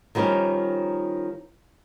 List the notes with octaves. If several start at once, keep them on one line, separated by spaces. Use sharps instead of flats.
D#3 F3 G3 C#4 A#4